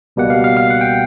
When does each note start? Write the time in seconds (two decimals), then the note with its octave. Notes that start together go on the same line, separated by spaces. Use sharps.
0.16 C#2 B2 G3 A#3 F#5
0.30 F5
0.44 F5
0.57 F5
0.70 F#5
0.81 G5